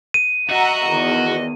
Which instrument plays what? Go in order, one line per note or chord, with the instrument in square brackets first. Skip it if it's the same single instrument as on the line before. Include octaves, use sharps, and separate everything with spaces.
[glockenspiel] D#7
[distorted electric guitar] F#4 [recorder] D#5 [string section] E5 F#5 A#5
[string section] E2 D#3